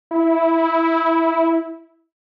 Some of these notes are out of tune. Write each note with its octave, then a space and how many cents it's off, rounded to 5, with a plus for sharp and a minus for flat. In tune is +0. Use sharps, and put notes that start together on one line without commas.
E4 -10